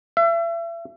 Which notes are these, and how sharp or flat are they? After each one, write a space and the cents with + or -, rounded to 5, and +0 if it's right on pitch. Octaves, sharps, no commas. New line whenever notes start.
E5 +35